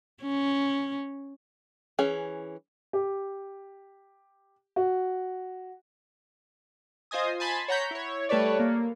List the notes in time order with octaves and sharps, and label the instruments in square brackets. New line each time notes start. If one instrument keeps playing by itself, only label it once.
[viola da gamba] C#4
[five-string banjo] E3 C#4 G#4
[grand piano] G4
F#4
[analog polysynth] F4 C5 D#5 G#5 D#6
G#5 A5 B5 C6
C#5 F#5 A#5 G6 B6
E4 C#5
G3 A3 A4 B4 C#5 D5
A#3